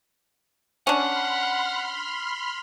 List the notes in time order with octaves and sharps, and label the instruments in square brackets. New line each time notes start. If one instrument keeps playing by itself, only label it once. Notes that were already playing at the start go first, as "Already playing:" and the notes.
[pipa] C#4 D4 [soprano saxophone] F#5 [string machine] B5 C6 F6